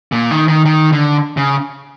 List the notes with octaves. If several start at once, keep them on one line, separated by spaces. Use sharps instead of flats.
A#2
D#3
D#3
D#3
D3
C#3